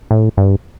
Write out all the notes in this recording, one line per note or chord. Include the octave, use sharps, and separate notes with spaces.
A2
G2